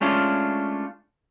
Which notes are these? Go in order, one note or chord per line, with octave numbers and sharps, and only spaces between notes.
G#3 A3 C#4 D4 F4